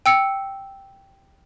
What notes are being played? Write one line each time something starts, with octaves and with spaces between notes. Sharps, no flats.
G5 E6 C#7